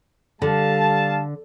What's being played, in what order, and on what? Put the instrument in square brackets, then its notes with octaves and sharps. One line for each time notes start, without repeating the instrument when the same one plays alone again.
[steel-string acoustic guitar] D3 [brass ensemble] G3 F5 A5